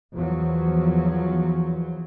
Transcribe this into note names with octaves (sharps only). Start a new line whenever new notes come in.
E2 F3 F#3